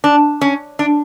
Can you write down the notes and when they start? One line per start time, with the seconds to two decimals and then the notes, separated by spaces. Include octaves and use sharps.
0.04 D4
0.41 C#4
0.79 D4